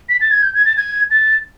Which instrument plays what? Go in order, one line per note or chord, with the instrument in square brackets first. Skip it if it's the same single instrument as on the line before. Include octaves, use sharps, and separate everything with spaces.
[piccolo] B6
A6
G#6
G6
G#6
A6
G#6
A6